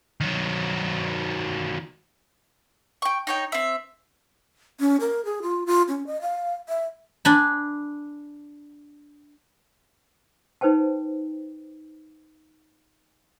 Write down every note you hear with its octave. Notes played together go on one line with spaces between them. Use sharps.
D#3 F#3
G5 C#6
D#4 C#5 G5
C4 E5
C#4
A#4
G#4
F4
F4
C#4
D#5
F5
E5
D4 G#5 B5
D#4 B4 C5 G5 A5